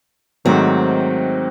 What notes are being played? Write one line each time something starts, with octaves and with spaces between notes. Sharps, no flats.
G#2 D#3 F#3 A3 C4